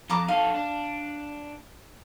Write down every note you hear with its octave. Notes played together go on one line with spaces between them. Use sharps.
F2 A5 A#5 D6
D#4 A4 F5
D4